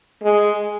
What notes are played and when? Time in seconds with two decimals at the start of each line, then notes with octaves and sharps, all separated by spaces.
0.23 G#3